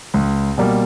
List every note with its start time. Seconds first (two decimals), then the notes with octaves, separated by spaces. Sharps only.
0.14 C#2
0.58 B2 G3 A#3